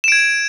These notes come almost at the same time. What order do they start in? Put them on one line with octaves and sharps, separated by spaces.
E7 D7 G#6